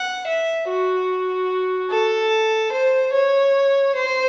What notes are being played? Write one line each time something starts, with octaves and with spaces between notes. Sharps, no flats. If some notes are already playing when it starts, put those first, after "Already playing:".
Already playing: F#5
E5
F#4
A4
C5
C#5
C5